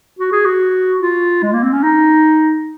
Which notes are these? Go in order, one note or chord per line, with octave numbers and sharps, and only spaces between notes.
F#4
G#4
F#4
F4
G#3
A#3
C4
C#4
D#4